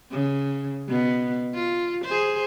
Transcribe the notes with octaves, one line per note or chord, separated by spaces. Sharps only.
C#3
B2 B3
F4
G#4 C5